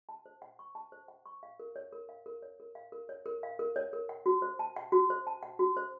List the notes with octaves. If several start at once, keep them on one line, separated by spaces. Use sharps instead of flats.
A5
C5
F#5
C#6
A5
C5
F#5
C#6
F5
A#4
C#5
A#4
F5
A#4
C#5
A#4
F5
A#4
C#5
A#4
F5
A#4
C#5
A#4
F#5
F#4
C5
A5
F#5
F#4
C5
A5
F#5
F#4
C5